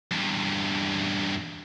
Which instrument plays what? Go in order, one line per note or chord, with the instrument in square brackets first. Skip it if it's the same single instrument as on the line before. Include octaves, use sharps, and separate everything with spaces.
[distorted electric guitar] E2 G2